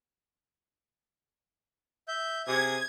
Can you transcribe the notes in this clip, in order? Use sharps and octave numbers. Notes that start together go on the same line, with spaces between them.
E5 G6
C3 G#4 D#6 G#6